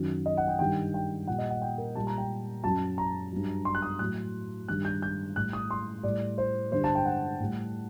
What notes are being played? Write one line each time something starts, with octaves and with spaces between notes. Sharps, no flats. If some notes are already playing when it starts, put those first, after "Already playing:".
Already playing: F#2 D#3 F#3
D#5
F#5
G5
G2 D#3 G3 G5
G5
A#2 G3 F#5
D#5
F#5
G5
A#4
A#2 G3 A5
A#5
G5
F#2 F#3 A5
A#5
G2 F#3
C6
F#6
D#6
A2 F#3 F#6
G2 D#3 G3 F#6
G6
G6
A2 G3 F#6
D#6
C6
A2 G3 D5
C5
G2 D3 G3 C5
A5
G5
F#5
A2 G3